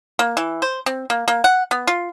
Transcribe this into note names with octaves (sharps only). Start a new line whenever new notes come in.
A#3
E3
C5
C4
A#3
A#3
F#5
B3
F4